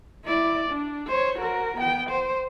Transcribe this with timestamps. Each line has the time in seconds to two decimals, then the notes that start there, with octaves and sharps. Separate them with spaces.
0.24 E4 D5
0.69 D4
1.08 C5 C#5
1.39 F#4 A#4
1.77 B3 G5
2.10 C5